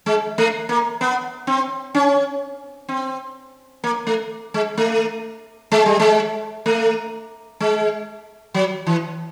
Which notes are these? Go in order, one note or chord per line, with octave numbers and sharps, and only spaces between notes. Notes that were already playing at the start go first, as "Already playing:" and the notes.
G#3
A3
A#3
B3
C4
C#4
C4
A#3
A3
G#3
A3
G#3
G3
G#3
A3
G#3
F#3
E3